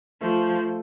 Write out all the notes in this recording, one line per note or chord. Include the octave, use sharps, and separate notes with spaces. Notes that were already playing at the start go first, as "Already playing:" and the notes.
F3 A3